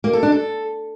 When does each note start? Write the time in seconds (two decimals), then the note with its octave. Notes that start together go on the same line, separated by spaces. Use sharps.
0.04 A#3
0.13 A4
0.23 D4
0.32 A4